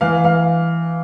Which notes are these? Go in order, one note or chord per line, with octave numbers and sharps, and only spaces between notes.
E3 F5
E3 F5